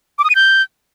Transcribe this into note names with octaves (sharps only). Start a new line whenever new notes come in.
D6
D#6
D#7
G6